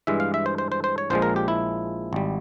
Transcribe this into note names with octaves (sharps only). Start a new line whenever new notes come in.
G2 E3 G#3 E5
F5
E5
C5
C5
C5
C5
C#5
A#1 A#2 F3 G#3 C5
A#4
G4
E4
G#1 G3